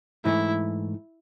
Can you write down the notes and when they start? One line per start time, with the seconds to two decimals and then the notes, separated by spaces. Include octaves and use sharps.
0.25 G#2 E3 A3 E4